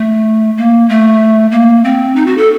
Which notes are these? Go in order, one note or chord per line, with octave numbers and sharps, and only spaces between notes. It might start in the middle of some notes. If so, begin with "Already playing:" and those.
Already playing: A3
A#3
A3
A#3
C4
D#4
F#4
A4